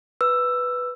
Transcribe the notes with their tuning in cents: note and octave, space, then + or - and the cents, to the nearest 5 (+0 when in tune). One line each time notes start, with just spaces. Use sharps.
B4 +0 E6 +10